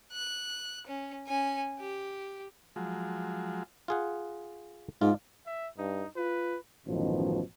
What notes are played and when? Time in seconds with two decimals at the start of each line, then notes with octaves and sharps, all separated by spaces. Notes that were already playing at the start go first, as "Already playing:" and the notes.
0.12 F#6
0.87 C#4
1.27 C#4 G#5
1.80 G4
2.76 F3 F#3 G#3
3.88 F4 G#4 F#5
5.01 G#2 F4
5.46 E5
5.78 G2 D#4
6.16 F4 B4
6.86 A1 F#2 B2 D#3 F3